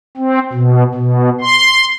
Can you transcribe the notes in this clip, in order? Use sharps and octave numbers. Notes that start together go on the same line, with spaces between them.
C4
B2
B2
C6